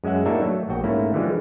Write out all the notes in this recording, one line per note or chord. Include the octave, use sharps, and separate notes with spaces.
F#2 G#3 C#4 E5 F#5
A2 A#3 D4 D#4 F#4 E5
F#3 A3 A4
A#1 F#4 G5
G#2 A3 A#3 C#4 E4
D3 E3 F3 G3 G#3